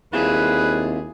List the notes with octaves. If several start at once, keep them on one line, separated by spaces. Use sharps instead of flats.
D#2 C4 E4 F4 G#4 B4